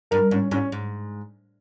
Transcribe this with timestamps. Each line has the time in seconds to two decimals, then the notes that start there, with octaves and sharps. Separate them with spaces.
0.11 G2 A#4
0.31 G#2 C#4
0.51 G#2 C#4
0.72 G#2